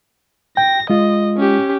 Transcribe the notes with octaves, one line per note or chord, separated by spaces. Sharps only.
G5 A#6
G#3 F4 D#5
C#4 G4